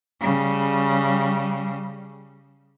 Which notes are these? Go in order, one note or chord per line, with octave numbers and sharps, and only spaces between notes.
C#3 G3